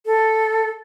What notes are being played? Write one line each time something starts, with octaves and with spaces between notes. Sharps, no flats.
A4